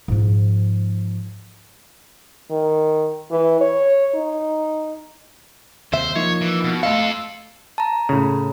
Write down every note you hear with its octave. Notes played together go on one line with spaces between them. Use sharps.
G#2 F3
D#3
E3
C#5
D#4
D#2 C3 C5 E5
F3 A#3 D#4 C#5
E3
B2
A3 F4 A4 D#5 F5
A5 A#5
A2 C#3